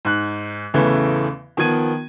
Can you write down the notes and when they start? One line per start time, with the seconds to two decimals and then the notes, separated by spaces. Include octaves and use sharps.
0.05 G#2 F#6
0.74 A1 E2 C#3 E3 A3
1.57 D#3 F3 B3 G#6 D#7